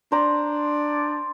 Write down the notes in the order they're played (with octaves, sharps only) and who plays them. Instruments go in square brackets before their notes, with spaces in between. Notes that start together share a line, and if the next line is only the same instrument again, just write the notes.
[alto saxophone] D4 [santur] C5 D5 A#5